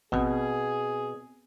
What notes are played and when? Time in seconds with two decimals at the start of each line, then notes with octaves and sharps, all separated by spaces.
0.12 A1 B2 B3 C4 G#4